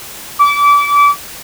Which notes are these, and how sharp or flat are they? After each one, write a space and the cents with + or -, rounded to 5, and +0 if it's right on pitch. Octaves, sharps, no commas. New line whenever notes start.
D6 -30